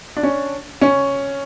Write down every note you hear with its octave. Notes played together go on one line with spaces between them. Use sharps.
D4
C#4
C#4